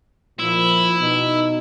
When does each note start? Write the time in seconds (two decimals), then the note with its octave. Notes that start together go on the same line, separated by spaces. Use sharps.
0.39 A#2 F3 E4
0.99 B2 D#4